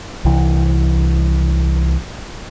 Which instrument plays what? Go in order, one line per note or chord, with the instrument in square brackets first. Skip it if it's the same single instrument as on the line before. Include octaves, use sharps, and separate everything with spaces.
[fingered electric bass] C2 E3